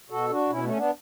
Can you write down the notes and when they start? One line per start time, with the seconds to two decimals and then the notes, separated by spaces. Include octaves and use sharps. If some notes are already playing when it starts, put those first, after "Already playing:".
0.10 B2 F#4 A4
0.30 D4 F#4
0.49 B2 C#4 E4
0.64 A3 C#4
0.76 B3 D4